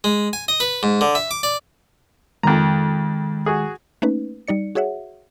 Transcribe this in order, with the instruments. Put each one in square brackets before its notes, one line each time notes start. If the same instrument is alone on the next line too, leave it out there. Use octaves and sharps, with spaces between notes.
[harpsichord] G#3
G#5
D#5
B4
G#2
D3
E5
D6
D5
[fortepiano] F2 A#5 [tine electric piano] D#3 G#3
[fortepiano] F#4 G#4
[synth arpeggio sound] A3 A#3 C#4 D#4 B4
G3 D#4 D5 C#7
F#4 G#4 C#5 E5 F#5